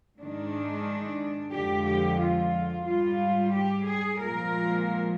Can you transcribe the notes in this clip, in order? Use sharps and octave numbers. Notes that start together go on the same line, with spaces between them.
G#2 D#3 G#3 D4
F2 D3 F3 G#3 G4
G4
F4
G#2 G3 F4
G4
G#4
A#2 F3 G#3 A#4